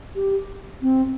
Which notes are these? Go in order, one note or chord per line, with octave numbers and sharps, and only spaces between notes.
G4
C4